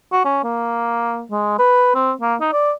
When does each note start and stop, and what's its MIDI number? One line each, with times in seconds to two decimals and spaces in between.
0.12 0.22 66
0.25 0.40 61
0.44 1.23 58
1.31 1.54 56
1.59 1.91 71
1.95 2.12 60
2.22 2.35 58
2.41 2.49 63
2.52 2.72 74